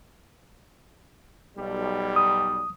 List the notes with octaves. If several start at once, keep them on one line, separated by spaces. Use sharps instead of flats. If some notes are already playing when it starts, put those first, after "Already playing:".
B1 G3
D#6